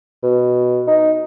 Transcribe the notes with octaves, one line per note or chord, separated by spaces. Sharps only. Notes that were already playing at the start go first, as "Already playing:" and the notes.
B2
D#4